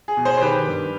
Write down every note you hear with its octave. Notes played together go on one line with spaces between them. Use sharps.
G#4
B2
G#4 C5
C5
D#3 G4 B4
G2